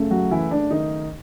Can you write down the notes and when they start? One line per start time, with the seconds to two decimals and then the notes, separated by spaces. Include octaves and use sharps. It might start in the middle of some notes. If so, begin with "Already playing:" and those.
Already playing: F#2 C#3 A3
0.11 F#3 F#4
0.31 E3 E4
0.51 D4
0.70 D#3 D#4